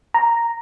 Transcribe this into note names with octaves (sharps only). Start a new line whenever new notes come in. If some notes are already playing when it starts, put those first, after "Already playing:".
A#5